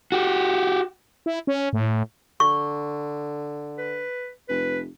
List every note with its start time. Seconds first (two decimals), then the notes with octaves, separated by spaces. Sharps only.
0.12 F#4 G4
1.26 E4
1.47 C#4
1.73 A2
2.40 D3 C#6
3.78 B4
4.49 F1 B4